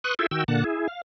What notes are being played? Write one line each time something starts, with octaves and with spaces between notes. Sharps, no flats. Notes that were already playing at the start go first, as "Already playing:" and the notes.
B4 C6 C#6 D#6 F#6
E4 F4 G#4 A4 E5 G5
D#3 F#4 G5 E6
A#2 D3 A#3 F#5 A5
E4 G#4
F5